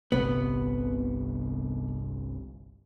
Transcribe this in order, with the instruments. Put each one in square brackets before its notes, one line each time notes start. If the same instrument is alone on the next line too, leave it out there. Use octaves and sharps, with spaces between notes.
[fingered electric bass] G1 C2 C3 [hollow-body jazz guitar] B3